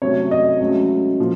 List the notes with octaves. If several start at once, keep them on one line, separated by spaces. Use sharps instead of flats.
C3 F#3 A3 C#4 C#5
D#5
C#2 C#3 F#3 A3 C#4
A#2 F3